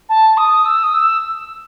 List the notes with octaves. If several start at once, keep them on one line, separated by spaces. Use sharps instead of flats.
A5
D#6
E6
D#6
E6